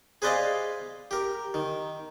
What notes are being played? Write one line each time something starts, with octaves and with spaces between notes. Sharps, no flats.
G#4 B4 C5 D5 D#5 F5
G4 A#4
D#3